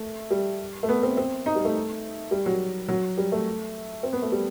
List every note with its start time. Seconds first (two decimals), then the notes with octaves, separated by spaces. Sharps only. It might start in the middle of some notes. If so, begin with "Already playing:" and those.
Already playing: A3
0.31 G3
0.83 A3
0.89 B3
1.03 C4
1.17 C4
1.46 D#4
1.55 G3
1.65 A3
2.31 G3
2.46 F#3
2.88 F#3
3.18 G3
3.32 A3
4.03 C4
4.13 B3
4.22 A3
4.32 G3